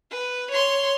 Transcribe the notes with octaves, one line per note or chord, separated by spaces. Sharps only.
B4
C#5 C6